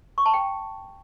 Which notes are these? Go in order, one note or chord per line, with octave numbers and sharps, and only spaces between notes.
C#6
A5
G5